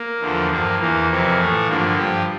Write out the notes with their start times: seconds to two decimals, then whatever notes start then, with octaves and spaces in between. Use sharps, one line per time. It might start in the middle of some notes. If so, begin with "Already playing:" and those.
Already playing: A#3
0.20 E2 D3 F3
0.49 G2 F3 A#3
0.79 E2 E3 A#3
1.09 F2 C3 E3
1.38 A2 E3 A3
1.68 G2 D3 F3 A#3
1.97 G2 F3 G4